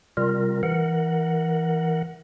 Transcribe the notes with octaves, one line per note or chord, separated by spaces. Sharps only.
C3 G3 F4 A#4
E3 A#4 F#5